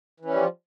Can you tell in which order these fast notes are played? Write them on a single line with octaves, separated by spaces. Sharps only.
E3 C#4 G3 F3